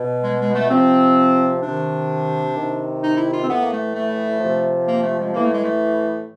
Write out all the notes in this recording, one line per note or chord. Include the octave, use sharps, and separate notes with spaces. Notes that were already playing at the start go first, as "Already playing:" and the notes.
Already playing: B2
G#3
G#3
A3
C3 F3 C4
C3 D#3 D4
C3 D#3
D#4
E4
F4
C4
A2 E3 B3
A#3
A3
A3
C3 F3
A#3
A3
G#3
A2 E3 A#3
A3
G#3
A3